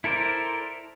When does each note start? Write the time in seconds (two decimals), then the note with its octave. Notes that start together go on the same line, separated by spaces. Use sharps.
0.04 E4 A4 A#4 C5 D5